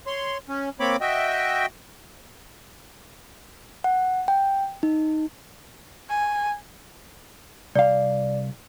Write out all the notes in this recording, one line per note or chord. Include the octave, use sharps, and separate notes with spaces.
C#5 C6
C#4
A#3 C4 C#5 B5 D6
F#4 D#5 E5 G5
F#5
G5
D#4
G#5
C2 D5 F5